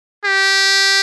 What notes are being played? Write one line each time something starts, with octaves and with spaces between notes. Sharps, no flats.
G4